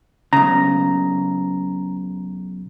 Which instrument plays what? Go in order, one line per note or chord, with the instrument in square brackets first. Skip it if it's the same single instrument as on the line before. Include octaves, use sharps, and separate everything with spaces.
[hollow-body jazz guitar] B1 C#3 [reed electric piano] A#5